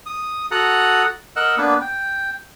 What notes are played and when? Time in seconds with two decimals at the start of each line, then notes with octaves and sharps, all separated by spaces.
0.06 D#6
0.51 F#4 A4 F#5 A#5 D#6 F#6
1.36 A#4 D#5 F#5 E6 F#6
1.58 A#3 B3 D4 B4
1.81 G5